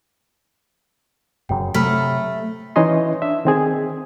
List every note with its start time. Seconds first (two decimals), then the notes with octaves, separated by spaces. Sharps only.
1.49 F1 F#2 C#3 G5
1.74 C3 F#3 A3 B5 F6 B6
2.76 E3 C#4 D#4 C#5 D#5 C6
3.22 D4 E5
3.45 D#3 C4 G#4